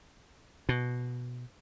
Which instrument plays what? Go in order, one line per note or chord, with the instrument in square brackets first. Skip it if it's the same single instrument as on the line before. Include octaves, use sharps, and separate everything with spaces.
[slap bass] B2